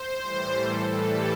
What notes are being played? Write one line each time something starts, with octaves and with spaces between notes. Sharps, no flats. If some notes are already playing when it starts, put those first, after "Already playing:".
Already playing: C5
A2 E3 G3
A4
A2 E3 G3 A4